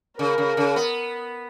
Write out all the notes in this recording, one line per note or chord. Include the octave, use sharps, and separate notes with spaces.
C#3 A#4
C#3
C#3
B3